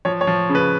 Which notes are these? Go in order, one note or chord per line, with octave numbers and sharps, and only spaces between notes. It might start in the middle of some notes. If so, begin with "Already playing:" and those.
F3 C#5
C#5
F3
C#3
B4